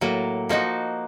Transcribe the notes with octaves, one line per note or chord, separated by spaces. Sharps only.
A2 F#3 A#3
F3 A#3 D#4 F#4